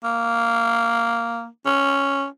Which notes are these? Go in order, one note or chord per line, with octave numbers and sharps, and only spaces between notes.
A#3
C#4